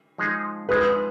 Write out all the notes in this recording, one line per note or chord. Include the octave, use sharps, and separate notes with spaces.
F3 G#3 D#4 G#4
F3 G#3 D#4 G#4 B4